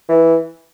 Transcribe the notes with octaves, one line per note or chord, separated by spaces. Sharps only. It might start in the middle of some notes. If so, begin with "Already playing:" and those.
E3